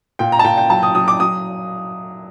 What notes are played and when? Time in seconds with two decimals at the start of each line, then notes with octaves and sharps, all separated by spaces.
0.19 A#2 G5
0.32 A#5
0.39 A5
0.44 A#2 G5
0.57 G5
0.70 F#3 A5
0.83 D#6
0.95 F#3 D#6
1.08 D6
1.20 F#3 D#6